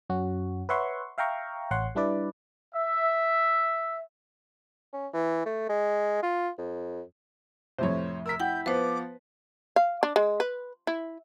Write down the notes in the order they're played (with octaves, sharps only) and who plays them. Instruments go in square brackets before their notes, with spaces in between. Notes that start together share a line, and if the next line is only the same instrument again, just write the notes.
[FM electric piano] F#2 C#4 F#4
B4 C#5 E5 F#5 C6 C#6
E5 F5 G5 A#5 C#6
A1 C#5 F#5 C6
G3 D4 E4 B4 D5
[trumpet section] E5
[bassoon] C#4
E3
A3
G#3
F4
F2
[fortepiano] F2 A2 C3 [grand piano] C5 C#5
[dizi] A#4 [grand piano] E6 B6
[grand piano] E4 [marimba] F#5 G5 [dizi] G6
[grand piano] F3 B3 [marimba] B4 C5 [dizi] D6
[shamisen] F5
D4
G#3
B4
E4